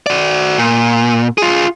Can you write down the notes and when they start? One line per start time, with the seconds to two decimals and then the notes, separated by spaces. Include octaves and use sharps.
0.07 F#4 D5
0.58 A#2
1.38 F4 G#4